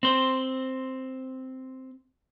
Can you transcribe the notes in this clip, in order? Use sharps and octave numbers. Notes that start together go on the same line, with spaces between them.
C4 C5